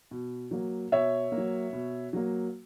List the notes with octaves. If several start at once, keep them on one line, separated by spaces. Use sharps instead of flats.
B2
F#3 A#3
B2 C#5 E5
A#3
F#3
B2
F#3 A#3